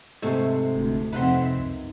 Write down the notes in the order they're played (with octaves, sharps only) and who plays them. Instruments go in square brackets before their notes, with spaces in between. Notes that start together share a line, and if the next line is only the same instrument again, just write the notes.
[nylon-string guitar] G#2 C3 [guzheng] A3
[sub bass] E1 [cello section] D2
[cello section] F2 C4 E5 [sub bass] C3 [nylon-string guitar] D#4 [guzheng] B4 F#5 C6
[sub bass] C#2 [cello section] F#2